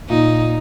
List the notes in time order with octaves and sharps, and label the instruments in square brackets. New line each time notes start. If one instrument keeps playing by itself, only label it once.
[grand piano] A#2 [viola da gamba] D#4